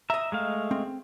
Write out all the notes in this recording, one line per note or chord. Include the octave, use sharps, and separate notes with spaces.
D#5 E5 A#5
G#3 A3 F5
C4